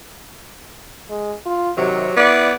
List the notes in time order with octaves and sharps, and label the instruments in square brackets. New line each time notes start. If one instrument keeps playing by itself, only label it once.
[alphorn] G#3
F4
[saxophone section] C3 F#3 [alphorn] D#3
[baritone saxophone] B3 [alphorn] E4 [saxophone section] D5